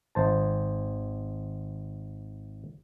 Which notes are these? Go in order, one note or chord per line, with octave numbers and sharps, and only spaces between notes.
G#1 C5 A5